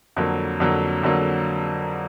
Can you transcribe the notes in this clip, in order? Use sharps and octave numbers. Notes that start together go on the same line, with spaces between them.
F2 D3 F#3 A#3
F2 D3 F#3 A#3
F2 D3 F#3 A#3